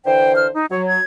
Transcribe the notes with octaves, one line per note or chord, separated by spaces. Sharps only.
D3 E3 C5 G5
F6
D#4
F#3 C#5
G#6